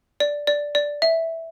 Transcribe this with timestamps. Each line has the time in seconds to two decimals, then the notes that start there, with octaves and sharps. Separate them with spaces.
0.20 D5
0.47 D5
0.75 D5
1.02 E5